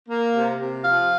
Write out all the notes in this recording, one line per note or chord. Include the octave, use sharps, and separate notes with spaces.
A#3
C3
C3
F3 F5